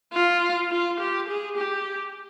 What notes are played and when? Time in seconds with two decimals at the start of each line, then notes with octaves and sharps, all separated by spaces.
0.13 F4
0.71 F4
1.00 G4
1.29 G#4
1.57 G4